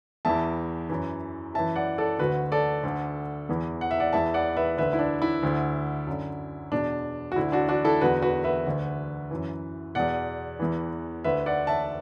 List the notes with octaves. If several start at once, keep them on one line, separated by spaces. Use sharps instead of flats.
E2 E3 E5 A5
F#2 E3
F#2 E3 E5 A5
D5 F#5
A4 D5
D2 D3 F#4 B4
A4 D5
D2 D3
E2 E3
F#5
E5
D5 F#5
E2 E3 E5 A5
D5 F#5
B4 E5
D2 D3 B4 E5
E4
D4
E4
D2 D3
F#2 D3
E2 B2 D4
F#4
D2 D3 E4
D4 F#4
D4 F#4
E4 A4
E2 D3 F#4 B4
F#4 B4
B4 E5
D2 D3
F#2 E3
E2 B2 D5 F#5
E2 E3
D2 D3 B4 E5
D5 F#5
E5 A5